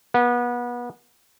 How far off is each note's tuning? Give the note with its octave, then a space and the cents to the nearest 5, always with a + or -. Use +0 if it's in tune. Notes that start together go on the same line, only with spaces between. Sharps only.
B3 -30